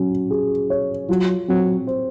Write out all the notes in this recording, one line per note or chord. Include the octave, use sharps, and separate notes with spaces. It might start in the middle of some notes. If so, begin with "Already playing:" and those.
Already playing: F#3 C#4
G#4
C#5
F#3 F4
F#3 C4
C5